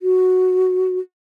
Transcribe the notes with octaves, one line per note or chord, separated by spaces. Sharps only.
F#4